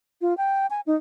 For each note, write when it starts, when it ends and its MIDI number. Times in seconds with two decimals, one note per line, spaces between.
0.21 0.36 65
0.37 0.66 79
0.70 0.81 80
0.87 0.96 63